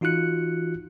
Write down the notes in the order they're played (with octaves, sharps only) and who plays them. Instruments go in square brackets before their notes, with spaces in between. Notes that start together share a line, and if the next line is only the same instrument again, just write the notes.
[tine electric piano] E3 D#4 F4 F#4 F#6 C#7